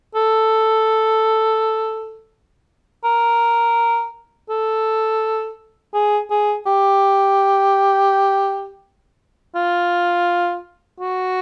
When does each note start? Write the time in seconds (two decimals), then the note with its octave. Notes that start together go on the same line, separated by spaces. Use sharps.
0.15 A4
3.05 A#4
4.50 A4
5.94 G#4
6.30 G#4
6.67 G4
9.55 F4
11.01 F#4